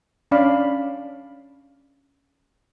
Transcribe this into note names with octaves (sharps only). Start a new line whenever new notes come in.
C#4 D4 D5 F5 B5